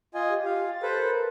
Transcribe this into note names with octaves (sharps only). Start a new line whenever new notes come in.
F4 D#5 G#5
G4
F4 F5
A6
A4 B4 C5
A#4